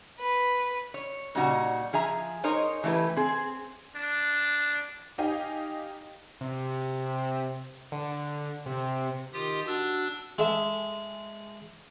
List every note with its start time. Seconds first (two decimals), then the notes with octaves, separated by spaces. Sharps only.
0.19 B4
0.94 C#5
1.35 A#2 C#3 G3 D#4 F#4
1.93 F3 G#4 E5 A#5
2.44 D#4 G#4 A#4 C5 C#5
2.84 E3 A3 E4 G4 B4
3.16 C4 G#4
3.96 D4
5.18 D#4 G4 D#5 F5 G5 G#5
6.41 C3
7.92 D3
8.66 C3
9.34 D#3 F4 G4 D#6
9.66 D4 F#4 E6
10.38 G#3 A4 D#5 E5